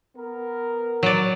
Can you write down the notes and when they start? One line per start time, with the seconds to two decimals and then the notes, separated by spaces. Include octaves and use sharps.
0.16 B3 A#4
1.03 F#3 D5